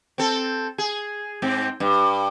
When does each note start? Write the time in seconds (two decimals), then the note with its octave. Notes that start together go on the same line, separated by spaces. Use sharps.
0.18 C4 A4
0.78 G#4
1.42 G#2 C4
1.80 G2